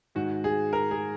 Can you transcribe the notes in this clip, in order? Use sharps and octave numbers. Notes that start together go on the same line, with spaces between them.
G#2 D#3 F#4
G#4
A#4
G#4